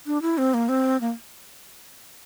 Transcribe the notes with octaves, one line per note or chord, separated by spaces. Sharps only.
D4
E4
C4
A#3
C4
A#3